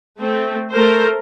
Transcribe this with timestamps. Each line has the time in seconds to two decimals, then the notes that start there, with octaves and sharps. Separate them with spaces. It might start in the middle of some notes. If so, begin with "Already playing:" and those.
0.18 A3 C4
0.73 A3 A#4 C5